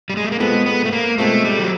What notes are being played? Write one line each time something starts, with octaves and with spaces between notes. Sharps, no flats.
G3
G#3
A3
A#3
B2 G#3 B3 C4 F4 A4
B3
A3
A#3
B2 G#3 A3 C4 F4 A4
G3
F#3